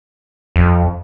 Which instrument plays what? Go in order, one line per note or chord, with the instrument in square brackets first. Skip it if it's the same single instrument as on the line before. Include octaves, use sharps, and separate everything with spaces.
[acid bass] F2